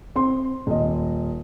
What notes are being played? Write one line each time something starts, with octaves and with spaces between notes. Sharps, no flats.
C4 C6
D#1 D#5